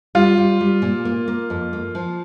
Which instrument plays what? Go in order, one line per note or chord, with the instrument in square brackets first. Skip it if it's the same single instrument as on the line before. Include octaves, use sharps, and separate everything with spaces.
[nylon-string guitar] G3 [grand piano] F4
[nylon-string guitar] G3
G3
A#2
A#3
A#3
F2
A#3
F3